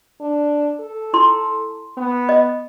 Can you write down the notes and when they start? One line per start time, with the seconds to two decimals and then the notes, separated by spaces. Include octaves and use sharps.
0.21 D4
0.80 A4
1.13 E4 C6
1.97 B3
2.29 D#5